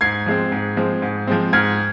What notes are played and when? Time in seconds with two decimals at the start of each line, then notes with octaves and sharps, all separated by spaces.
0.01 G#2 G#6 C7
0.26 F3 G#3 C4
0.52 G#2
0.77 F3 G#3 C4
1.02 G#2
1.27 F3 G#3 C4
1.53 G#2 F6 G#6